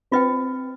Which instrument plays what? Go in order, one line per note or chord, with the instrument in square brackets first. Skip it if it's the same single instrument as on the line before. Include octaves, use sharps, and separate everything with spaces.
[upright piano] C4 [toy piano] F4 B4 D#5 G5